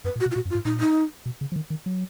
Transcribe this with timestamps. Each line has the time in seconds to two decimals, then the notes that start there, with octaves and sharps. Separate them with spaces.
0.04 F#2 B4
0.16 A#2
0.20 F#4
0.26 B2
0.31 F4
0.35 A#2 F#4
0.45 F#2
0.50 F4
0.55 G#2
0.65 A#2 D#4
0.80 D#4
1.26 B2
1.41 C#3
1.52 F3
1.56 D#3
1.70 D#3
1.86 F#3